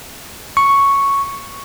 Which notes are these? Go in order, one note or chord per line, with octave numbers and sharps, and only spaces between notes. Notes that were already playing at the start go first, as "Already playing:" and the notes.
C#6